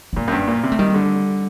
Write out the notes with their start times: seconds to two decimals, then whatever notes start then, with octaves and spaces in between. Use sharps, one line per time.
0.13 A3
0.16 A#2 A#3
0.28 F#2
0.32 G2
0.48 A#2
0.63 C3
0.72 A3
0.79 D#3 G3
0.94 D3